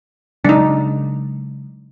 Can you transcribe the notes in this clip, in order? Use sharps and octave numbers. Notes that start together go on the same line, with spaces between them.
C#3 F#3 G#3 D4 D#4